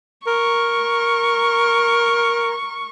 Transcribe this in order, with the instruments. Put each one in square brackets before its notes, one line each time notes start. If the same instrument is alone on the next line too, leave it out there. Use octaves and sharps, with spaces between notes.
[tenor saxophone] A#4 [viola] C#6